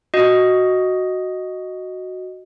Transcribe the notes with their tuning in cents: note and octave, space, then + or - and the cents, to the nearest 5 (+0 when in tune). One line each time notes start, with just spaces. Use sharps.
F#4 +0 D#5 +0